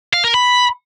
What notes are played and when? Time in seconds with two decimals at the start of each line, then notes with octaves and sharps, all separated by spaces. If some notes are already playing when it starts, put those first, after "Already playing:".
0.13 F5
0.24 A#4
0.34 B5